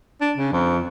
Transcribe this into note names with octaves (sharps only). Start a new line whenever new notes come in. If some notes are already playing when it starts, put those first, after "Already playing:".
D4
C#3
F2